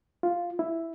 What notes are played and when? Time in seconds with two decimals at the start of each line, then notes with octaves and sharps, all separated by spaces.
0.23 F4
0.59 E4